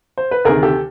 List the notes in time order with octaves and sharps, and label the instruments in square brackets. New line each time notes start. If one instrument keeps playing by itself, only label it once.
[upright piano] C5
B4
D2 C3 D#3 G#4 A#4
G4 A4